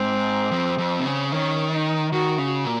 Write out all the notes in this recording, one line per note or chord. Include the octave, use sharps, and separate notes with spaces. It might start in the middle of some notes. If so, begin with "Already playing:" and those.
Already playing: G#2 C4
F2
F2
C3
C#3
D#3 C#4
D#4
D#3 F#4
C#3
A#2